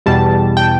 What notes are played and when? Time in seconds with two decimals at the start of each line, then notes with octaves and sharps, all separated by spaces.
0.06 E2 B2 G3 A5
0.57 G5